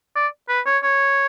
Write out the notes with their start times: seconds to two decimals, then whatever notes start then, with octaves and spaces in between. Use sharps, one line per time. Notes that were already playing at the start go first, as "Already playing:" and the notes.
0.15 D5
0.49 B4
0.66 C#5
0.83 C#5